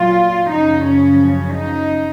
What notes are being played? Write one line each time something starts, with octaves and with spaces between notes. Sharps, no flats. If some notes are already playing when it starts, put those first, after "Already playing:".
Already playing: A#2 F#3 F4
F#2 C#3 F3 D#4
C#4
D#4